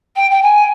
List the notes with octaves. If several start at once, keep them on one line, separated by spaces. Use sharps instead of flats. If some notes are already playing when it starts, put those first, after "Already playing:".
G5
G5
G#5